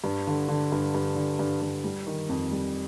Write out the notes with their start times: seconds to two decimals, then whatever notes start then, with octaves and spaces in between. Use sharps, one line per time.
0.04 G2
0.27 D3
0.48 D3
0.72 G2
0.95 G2
1.16 D3
1.39 G2
1.62 G2
1.84 G3
2.07 D#3
2.29 F2
2.51 G3